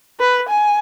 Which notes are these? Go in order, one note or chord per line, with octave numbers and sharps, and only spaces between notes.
B4
G#5